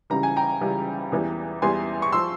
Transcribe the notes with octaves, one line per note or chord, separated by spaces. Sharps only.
C#2 C#3 E3 G3 A#5
G#5
G5 A#5
C#2 C#3 E3 G3
E2 E3 G3
E2 E3 G3 G#5 C6
C#6
F3 C6 E6